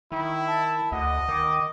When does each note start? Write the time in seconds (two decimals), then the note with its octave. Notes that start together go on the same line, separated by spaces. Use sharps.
0.12 D#3 E4
0.47 A5
0.92 D2 D#5 F#5
1.29 D#3 D6